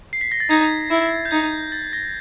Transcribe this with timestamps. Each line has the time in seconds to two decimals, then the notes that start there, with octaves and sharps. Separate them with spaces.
0.13 C7
0.21 B6
0.32 A#6
0.40 A6
0.50 D#4 G#6
0.91 E4
1.25 G6
1.31 D#4 G#6
1.72 A6
1.93 A#6